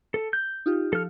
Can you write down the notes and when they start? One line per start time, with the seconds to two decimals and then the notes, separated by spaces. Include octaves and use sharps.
0.14 A4
0.33 G6
0.66 D#4 F4 G4
0.93 F3 A4 F6